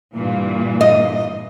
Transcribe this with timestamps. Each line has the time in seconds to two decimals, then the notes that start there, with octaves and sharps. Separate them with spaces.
0.13 G2 A#2 E3
0.81 D#5